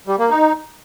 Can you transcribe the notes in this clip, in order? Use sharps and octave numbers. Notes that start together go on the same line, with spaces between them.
G3
A#3
D#4